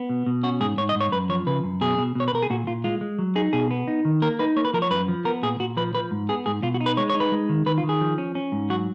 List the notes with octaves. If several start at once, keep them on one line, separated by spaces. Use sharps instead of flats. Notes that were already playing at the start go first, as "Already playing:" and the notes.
Already playing: B3
B2
B2
C#4 F#4
G#2 G#4
G#2 C#5
D#5
G#2
C#5
F#2 B4
F3 C#5
C#3 B4
F#2
B2 G#4
B2
B2 C#5
B4
B2 A#4
G#4
A#2 F#4
A#2 F4
G#3 F4
G#3
F#3
D#4 G#4
B2 G#4
B3
D#4
D#3
A#3 A#4
D#4 B4
A#3 C#5
B4
F3 A#4
C#5
F#2 B4
F3
B3 A#4
A#2 G#4
A#2 F#4
F3 B4
F3 B4
G#2
B3 G#4
G#2 G#4
B2 F4
F#4
D#4
B4
G#3 C#5
C#5
D#4
B4
G#3
D#3
D#3 B4
F4
D#3
G#4
F3
C#4
C#4
G#2
F#3 F#4